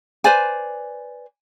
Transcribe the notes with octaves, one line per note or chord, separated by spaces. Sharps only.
B4 C5 D5 G#5